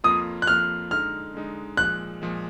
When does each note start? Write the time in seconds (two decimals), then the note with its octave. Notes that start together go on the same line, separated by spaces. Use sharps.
0.04 F2 F3 A#3 F4 D#6
0.42 F#6
0.47 F2 F3 A#3 F4 F6
0.91 D3 G#3 D#4 F6
1.34 D3 G#3 D#4
1.77 A#2 F3 G#3 F#6
2.22 A#2 F3 G#3